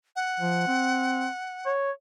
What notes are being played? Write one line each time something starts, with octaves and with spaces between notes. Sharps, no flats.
F#5
F3
C4
C#5